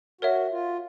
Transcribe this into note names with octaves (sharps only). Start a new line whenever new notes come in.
F#4 A#4 C#5 E5
F4